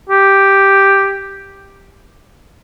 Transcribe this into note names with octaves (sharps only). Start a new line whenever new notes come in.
G4